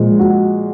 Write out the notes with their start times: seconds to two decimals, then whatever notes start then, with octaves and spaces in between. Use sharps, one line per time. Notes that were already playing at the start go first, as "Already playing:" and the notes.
Already playing: A#2 F3 G#3
0.19 F#4